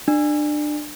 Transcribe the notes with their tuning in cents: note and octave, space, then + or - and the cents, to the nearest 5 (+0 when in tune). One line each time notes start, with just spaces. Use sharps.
D4 +25